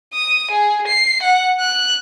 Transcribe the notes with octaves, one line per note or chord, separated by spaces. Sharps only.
D#6
G#4
C7
F#5
F#6